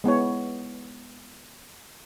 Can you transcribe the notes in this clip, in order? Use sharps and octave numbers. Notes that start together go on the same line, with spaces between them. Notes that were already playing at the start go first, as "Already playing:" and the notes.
G#3 B3 E4 C#5